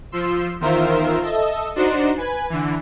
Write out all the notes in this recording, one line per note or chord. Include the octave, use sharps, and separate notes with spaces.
F3 C6 E6
E2 D#3 F4 A#4 C5 E5
A4 D#5 E5
D4 D#4 F#4 C5
B4 G#5
D3 E3